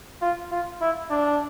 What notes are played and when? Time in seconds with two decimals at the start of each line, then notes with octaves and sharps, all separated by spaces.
0.22 F4
0.52 F4
0.81 E4
1.11 D4